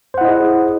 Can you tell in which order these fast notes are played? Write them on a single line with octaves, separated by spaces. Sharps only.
C5 F#5 E4 D#5 G#4